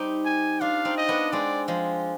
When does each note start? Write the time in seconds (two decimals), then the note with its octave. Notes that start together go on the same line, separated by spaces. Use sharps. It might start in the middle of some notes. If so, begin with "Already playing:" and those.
Already playing: G3 C4 D#4 G4
0.25 G#5
0.61 D4 F4 F5
0.85 C4 D#4
0.97 D#5
1.08 B3 D4
1.32 G#3 C4 D5
1.68 F3 G#3